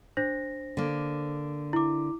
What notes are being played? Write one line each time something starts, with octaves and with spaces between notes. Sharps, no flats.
D4 C5 A#6
D3 A#3
E4 D6